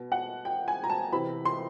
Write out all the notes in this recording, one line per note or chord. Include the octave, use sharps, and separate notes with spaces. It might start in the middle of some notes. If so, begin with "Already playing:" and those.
Already playing: B2
F#5
G5
G#5
A#5
A5
C3 E3 B5
C6